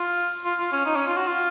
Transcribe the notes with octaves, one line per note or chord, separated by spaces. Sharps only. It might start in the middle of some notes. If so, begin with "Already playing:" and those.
Already playing: F4
F4
F4
C#4
D#4
C#4
F4
F#4
F4